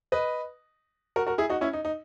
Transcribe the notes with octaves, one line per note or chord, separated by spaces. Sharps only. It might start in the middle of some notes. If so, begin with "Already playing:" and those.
B4 D#5
F#4 A#4
F#4 A#4
E4 G#4
D#4 F#4
C#4 E4
D#4
D#4